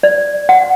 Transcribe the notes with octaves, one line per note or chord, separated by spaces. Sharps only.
D5
F#5